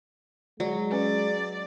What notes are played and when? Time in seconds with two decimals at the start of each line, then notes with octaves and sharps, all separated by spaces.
0.60 F#3 G#3 D5
0.92 C#4 B4 D5